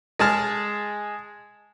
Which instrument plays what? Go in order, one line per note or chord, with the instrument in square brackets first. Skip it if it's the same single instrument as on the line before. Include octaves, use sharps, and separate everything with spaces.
[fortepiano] G#3 G#4 A5 F6